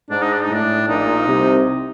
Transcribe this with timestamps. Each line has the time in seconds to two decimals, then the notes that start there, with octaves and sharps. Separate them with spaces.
0.10 G#2 D4
0.21 D#4
0.32 D4
0.43 D#4
0.49 A2 D4
0.88 A#1 A#2 D#4
1.26 C2 C3